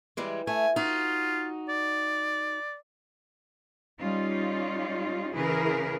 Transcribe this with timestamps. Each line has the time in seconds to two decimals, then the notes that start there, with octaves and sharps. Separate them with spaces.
0.17 E3 G3 G#3
0.47 A3 G#5
0.76 D#4 F4 F#4
1.69 D5
4.00 G3 C#4 D#4 F4
5.34 C#3 E3 E4 G#4 A#4 B4